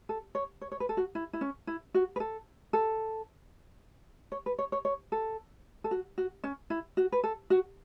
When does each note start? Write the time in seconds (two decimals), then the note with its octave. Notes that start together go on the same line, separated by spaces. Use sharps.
0.09 A4
0.35 C#5
0.61 C#5
0.72 C#5
0.80 B4
0.89 A4
0.97 F#4
1.15 E4
1.33 E4
1.41 C#4
1.67 E4
1.94 F#4
2.16 B4
2.20 A4
2.73 A4
4.32 C#5
4.46 B4
4.58 C#5
4.72 C#5
4.85 C#5
5.12 A4
5.84 A4
5.91 F#4
6.18 F#4
6.44 C#4
6.70 E4
6.97 F#4
7.12 B4
7.24 A4
7.50 F#4